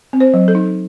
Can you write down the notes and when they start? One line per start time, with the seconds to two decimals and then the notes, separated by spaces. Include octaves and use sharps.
0.13 C4
0.20 C5
0.34 F#3
0.48 A4
0.55 D#4